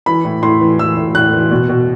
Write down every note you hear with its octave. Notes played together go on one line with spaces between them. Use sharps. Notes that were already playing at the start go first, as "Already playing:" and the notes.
E3 B5
A2
A2 C6
E3
E3 E6
A2
A2 F#6
E3
B2
B2